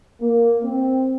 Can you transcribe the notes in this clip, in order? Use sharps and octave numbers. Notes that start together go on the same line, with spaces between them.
A#3
C4